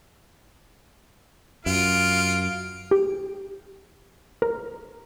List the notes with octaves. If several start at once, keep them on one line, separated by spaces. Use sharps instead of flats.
F#2 F4 F5 D7
G4
A#4